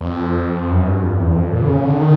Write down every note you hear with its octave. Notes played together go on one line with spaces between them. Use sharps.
E2
F2
F#2
G2
F2
E2
F2
A#2
D3
C#3
D3
D#3